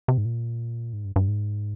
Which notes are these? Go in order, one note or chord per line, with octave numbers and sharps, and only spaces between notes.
C3
G#2
A#2
G#2
G2
G2
G#2